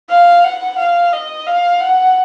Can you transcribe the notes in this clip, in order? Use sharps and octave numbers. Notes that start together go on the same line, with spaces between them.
F5
F#5
F5
D#5
F5
F#5